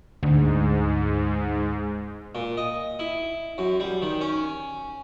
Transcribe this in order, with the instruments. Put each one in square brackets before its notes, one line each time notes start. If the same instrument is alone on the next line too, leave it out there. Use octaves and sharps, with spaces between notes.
[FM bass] D2 [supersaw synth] G#2
[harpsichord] A#2
D#5
E4
F#2
G3
D#3
C#4